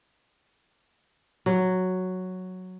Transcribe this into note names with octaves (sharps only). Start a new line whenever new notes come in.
F#3